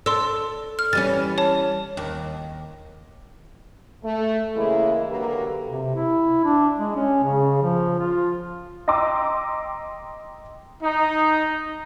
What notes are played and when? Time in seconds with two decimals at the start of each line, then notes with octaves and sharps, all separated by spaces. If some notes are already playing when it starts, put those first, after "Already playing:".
0.06 A4 D5 C6 E6
0.79 F6
0.93 E3 G3 C#4 A6
1.38 C#5 A5
1.97 D#2
4.04 A3
4.56 C#3 E3 G#3 A#3 E4
5.08 D3 F#3 A#3 G4 A4 B4
5.68 C3
5.95 E4
6.44 D4
6.78 G#3
6.95 C#4
7.24 C#3
7.62 F3
7.99 F4
8.88 D#5 G5 A#5 C6 D6 E6
10.83 D#4